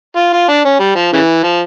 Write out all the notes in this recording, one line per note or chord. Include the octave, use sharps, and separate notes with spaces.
F4
F4
D4
C#4
G3
F3
C#3 E3
F3